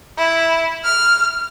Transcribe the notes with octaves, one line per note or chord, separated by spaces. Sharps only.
E4
F6